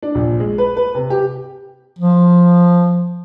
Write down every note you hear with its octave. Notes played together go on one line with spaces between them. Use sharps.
D4
A#1
G#3
B4
B4
C3
G4
F3